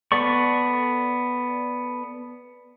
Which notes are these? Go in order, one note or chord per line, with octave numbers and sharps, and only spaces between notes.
B3 A4 D5 C#6